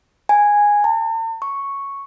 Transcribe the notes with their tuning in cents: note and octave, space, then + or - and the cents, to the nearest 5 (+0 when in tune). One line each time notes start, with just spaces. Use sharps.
G#5 -5
A5 +45
C#6 +0